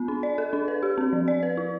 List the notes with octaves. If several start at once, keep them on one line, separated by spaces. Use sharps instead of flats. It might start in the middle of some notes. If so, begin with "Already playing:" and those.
Already playing: B3
D4
D5
A4
D4
B4
G4
C4
F3
D5
B4
E4